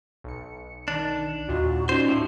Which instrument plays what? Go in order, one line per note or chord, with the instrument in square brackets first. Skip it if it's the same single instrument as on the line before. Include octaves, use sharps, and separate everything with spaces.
[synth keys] B1 C#7
[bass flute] D#3 [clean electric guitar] D4
[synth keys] D#2 A#2 F4 [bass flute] F#4
[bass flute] C#4 [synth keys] D#4 F4 D5 [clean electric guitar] C5
[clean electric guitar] A2